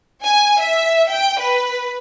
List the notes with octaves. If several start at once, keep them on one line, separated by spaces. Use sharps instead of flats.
G#5
E5
G5
B4